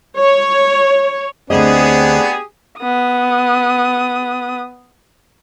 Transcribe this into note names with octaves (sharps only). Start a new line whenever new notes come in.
C#5
D2 C#3 B3 C4 D4 G4 G#4 D#5
B3 D#6